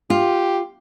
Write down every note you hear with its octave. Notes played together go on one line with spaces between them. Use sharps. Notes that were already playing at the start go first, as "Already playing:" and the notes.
F4 G4